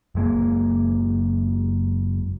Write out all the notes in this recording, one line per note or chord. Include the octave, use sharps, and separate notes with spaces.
F#1 G#3 A#3